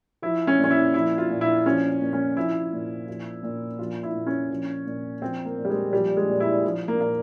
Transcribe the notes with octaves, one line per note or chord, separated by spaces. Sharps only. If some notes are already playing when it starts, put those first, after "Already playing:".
F3 E4
C#4
A#2
C#4
E4
F3 E4
F4
A#2
E4
F3 C#4
A#2
C#4
F3 E4
A#2
F3
A#2
F3 F4
E4
A#2
C#4
F3
A#2
F3 C4
A#3
A#2
G3
G#3
F3 G3
G#3
A#2
E4
F3
A#3
A#2 A#3